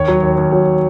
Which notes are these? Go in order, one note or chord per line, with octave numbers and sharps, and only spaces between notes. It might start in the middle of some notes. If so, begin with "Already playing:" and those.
Already playing: D#2 C#5
F#3
D#2
D#2
F#3